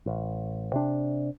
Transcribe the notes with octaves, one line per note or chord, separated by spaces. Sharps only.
A1
C3 D4